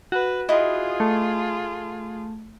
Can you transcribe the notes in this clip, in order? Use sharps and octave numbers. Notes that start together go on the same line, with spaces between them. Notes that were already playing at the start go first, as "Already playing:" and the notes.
F#4 B4
E4 F4 G#4 D#5 D#6
A3